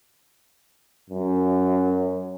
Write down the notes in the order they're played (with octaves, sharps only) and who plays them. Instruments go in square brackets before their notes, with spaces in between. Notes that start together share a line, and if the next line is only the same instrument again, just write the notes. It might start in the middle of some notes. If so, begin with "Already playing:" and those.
[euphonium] F#2